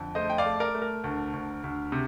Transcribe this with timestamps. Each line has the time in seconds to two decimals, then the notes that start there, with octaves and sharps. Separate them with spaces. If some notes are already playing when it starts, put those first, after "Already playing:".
Already playing: F2 D3
0.15 A3 C5 D#5
0.30 G5
0.38 D5 F5
0.46 A3
0.60 A#4 D5
0.75 A3
0.82 A#4
1.04 D2
1.33 D2
1.64 D2
1.92 C3